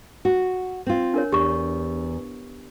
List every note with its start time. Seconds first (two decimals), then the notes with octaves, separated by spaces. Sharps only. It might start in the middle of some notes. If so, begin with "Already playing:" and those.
0.25 F#4
0.86 C4 F4
1.14 D4 A#4 C#5
1.32 E2 G4 C#6